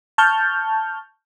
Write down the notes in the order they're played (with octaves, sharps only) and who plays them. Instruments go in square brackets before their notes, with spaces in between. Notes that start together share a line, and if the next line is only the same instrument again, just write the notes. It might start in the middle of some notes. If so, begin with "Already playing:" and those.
[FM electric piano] A5 C#6 F6 G6